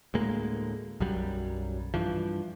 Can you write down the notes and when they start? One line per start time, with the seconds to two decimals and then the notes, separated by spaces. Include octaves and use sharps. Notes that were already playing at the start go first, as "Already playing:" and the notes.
0.14 D2 A2 G#3 A#3
1.00 B1 F#2 F#3 G3
1.94 G2 E3 F3